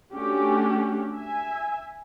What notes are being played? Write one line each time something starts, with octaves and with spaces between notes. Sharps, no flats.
A3 C#4 D4 F#4 G4
E5 G#5